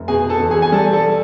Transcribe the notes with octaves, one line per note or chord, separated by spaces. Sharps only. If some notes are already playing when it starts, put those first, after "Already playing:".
Already playing: F1
B2 G#4 G#5
A4 A5
E2
G#4 G#5
G#5
G3 A4 A5
A4 A5